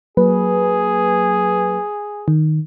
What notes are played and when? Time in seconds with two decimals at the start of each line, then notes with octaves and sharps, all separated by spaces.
0.17 F#3 A#3 G#4 B4
2.28 D#3